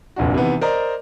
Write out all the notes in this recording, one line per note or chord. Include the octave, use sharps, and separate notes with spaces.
F1 A#1 D4 F#4
C3 D#3 E3 B3 B4
A#4 C5 D5 D#5 A#5